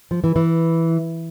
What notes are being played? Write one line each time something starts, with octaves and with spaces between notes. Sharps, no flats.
F3
E3
E3